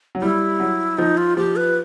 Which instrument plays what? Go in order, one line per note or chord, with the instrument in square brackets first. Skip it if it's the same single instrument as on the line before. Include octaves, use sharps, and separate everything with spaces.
[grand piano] F#3
[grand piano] G3 [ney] E4
[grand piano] F#3
[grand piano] F3 [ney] D#4
[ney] F4
[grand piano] F3 [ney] G4
[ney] B4